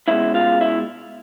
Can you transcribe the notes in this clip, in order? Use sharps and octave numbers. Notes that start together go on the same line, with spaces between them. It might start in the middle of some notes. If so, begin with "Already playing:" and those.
B2 G#3 C#4 E4 E5
F4 F5
E4 E5